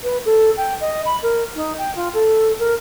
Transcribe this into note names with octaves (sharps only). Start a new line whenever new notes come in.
B4
A4
G5
D#5
B5
A#4
D#4
G5
F4
A4
A#4